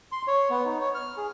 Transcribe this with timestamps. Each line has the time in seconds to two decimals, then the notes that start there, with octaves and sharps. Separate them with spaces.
0.12 C6
0.27 C#5
0.50 B3
0.65 D#4
0.81 C#5
0.95 F6
1.17 G#4